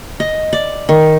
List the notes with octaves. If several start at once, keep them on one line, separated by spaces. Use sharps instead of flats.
D#5
D5
D#3